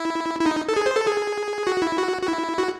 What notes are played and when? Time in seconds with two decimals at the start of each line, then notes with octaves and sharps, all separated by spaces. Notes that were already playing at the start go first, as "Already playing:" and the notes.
Already playing: E4
0.40 E4
0.46 D#4
0.69 A4
0.76 G#4
0.86 C5
0.96 A4
1.07 G#4
1.67 F#4
1.82 E4
1.98 F#4
2.22 F#4
2.28 E4
2.58 F#4